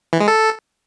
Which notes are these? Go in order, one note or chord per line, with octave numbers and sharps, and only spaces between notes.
E3
G#3
A4